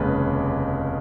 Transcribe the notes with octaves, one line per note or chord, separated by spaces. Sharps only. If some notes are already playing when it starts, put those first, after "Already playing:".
Already playing: F1 D#2 C#3 G#3 B4